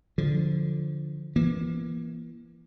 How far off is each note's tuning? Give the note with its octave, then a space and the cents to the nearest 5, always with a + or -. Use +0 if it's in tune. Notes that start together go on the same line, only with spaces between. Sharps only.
D3 +0 F3 +0
E3 +25 A#3 +25